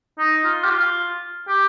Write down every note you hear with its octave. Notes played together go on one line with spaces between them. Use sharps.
D#4
F4
G4
F4
G4